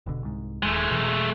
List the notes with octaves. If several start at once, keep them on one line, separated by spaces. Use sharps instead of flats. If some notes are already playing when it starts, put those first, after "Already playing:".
E1 B2 D3
C2 G#2
D#1 D#2 G#3 A3
F1 B2 E3